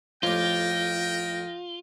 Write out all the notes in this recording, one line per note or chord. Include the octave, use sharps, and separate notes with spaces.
F2 A2 F4 G4 A#4 D#5 G5